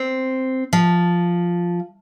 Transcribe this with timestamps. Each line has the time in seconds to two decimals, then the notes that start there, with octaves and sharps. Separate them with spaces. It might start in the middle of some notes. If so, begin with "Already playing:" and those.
Already playing: C4
0.73 F3